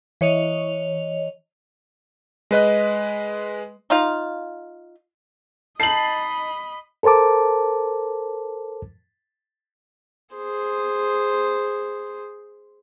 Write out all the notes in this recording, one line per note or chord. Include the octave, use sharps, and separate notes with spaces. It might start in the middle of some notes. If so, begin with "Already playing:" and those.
E3 C#5 D#5 F7
G#3 B4 D#5 F#6
D#4 F4 F5
D#4 D#5 A5 B5 C7 F#7
A4 A#4 C5 A5 D6
G#4 C5